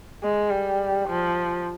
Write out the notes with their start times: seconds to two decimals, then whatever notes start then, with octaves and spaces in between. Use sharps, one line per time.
0.23 G#3
0.51 G3
1.09 F3